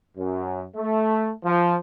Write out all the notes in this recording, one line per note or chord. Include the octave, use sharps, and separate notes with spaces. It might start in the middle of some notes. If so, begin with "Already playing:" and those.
F#2
A3
F3